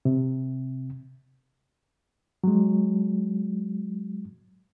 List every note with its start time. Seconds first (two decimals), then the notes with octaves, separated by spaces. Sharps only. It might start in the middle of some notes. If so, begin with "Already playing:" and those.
0.05 C3
2.44 F#3 G#3